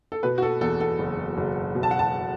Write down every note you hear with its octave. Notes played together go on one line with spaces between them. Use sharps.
A4
B2 B4
F#4
A4
E2 A4
A4
F#1
F#1
B2
A5
F#5
A5